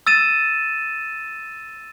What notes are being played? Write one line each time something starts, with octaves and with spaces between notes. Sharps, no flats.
E6 A6 D#7 E7